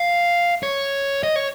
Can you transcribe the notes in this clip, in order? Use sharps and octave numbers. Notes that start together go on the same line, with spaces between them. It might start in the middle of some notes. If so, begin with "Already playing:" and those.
Already playing: F5
C#5
D#5
C#5